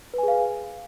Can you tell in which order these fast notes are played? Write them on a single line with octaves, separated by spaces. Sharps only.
B4 G#5 G#4 F5